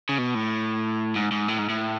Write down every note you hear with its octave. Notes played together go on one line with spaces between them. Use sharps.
C#3
B2
A2
G#2
G#2
A2
G#2
A2